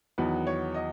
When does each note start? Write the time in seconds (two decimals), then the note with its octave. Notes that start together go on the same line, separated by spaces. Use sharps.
0.18 E2 D#3 F#3 B3 B4
0.47 C#5
0.74 D#5